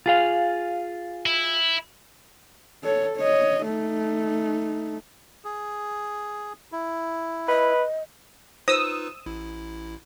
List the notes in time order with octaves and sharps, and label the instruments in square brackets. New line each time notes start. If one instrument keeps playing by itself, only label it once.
[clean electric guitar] F4 G#4 F5
[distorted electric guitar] E4
[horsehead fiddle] A4 C#5
C#5 D#5
A3 D#4
[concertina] G#4
E4
[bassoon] B4 [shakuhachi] D#5
[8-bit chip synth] D#4 F4 B4 [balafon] C5 [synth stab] D#6 E6
[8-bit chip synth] A1 E4